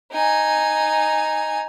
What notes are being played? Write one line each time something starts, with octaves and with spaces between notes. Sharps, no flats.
D#4 G#5